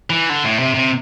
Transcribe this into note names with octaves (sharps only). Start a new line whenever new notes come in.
E3
D3
A2
C3
C3